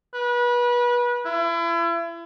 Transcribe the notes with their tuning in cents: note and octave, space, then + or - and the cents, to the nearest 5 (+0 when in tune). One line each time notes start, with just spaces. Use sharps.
B4 -30
E4 +35